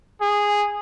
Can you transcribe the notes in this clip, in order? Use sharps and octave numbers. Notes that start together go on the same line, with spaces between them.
G#4